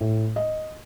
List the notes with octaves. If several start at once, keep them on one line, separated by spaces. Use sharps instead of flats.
A2
D#5